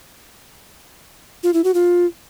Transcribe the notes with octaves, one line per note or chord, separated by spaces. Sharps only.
F4
E4
F#4
F4